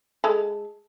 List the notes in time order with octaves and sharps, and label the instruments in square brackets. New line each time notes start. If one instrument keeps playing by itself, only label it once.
[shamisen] G#3 A4